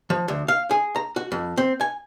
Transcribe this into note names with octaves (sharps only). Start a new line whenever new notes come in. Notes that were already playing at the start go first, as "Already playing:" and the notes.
F3
D2
F5
G#4
A#5
F#4
F2
C4
G#5